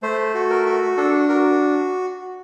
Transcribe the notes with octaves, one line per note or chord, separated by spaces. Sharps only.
A3 C5
F#4
A#4
F#4
D4 A4
F#4 A#4